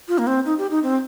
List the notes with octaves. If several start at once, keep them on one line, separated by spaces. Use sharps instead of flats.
F4
A#3
C4
D#4
G4
D#4
C4